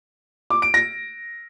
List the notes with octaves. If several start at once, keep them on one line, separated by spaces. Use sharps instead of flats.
D6
D7
A#6